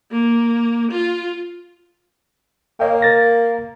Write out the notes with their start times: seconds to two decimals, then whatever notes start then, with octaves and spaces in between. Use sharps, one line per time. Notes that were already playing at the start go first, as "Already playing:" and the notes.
0.11 A#3
0.91 F4
2.80 A#3 C#5 D#5 G5
3.02 A#4 A6 A#6